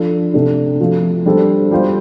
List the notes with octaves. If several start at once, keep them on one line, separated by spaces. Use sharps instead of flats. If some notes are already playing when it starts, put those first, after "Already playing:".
Already playing: F3 D4 A4
C3 A3 D4 G4
F3 A3 C4 F4
G3 D4 A4 C5
G3 F4 C5